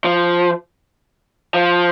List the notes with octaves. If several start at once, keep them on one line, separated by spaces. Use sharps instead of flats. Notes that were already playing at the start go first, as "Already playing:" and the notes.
F3
F3